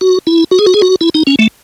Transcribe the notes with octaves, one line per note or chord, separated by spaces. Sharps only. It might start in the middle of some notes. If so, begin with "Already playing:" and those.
F#4
E4
F#4
G#4
F#4
G#4
F#4
E4
D#4
C#4
A3